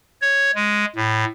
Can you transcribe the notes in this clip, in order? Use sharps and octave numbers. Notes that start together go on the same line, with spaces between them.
C#5
G#3
A2